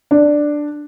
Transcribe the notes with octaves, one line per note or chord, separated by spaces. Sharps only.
D4